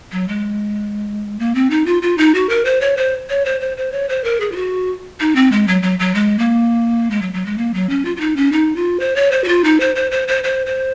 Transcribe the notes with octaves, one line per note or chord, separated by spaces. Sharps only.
F#3
G#3
A#3
C4
D#4
F4
F4
D#4
F#4
A#4
C5
C#5
C5
C#5
C5
C5
C5
C#5
C5
A#4
G#4
F4
F#4
D#4
C4
G#3
F#3
F#3
F#3
G#3
A#3
G#3
F#3
F#3
G#3
A#3
F#3
C#4
F4
F4
D#4
C#4
D#4
F4
C5
C#5
C5
F#4
F4
D#4
C5
C5
C5
C5
C5
C5